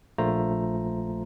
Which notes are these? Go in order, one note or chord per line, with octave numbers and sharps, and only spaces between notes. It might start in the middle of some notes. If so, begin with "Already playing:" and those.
A#1 A3 F4 C5 A#5